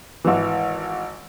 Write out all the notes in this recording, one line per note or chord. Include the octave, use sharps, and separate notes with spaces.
G#1 E3